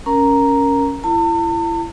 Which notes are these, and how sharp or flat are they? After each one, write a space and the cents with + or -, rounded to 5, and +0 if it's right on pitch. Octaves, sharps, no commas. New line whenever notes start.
C#4 +0 A#4 +0 A#5 +0
E4 +30 A5 +45